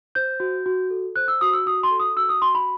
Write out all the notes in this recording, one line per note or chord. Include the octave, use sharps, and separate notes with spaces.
C5 G6
F#4
F#4
A4
C5 F#6
E6
F#4 D#6
E6
F#4 D#6
C6
A4
D#6
F#4 E6
D#6
F#4 C6
B5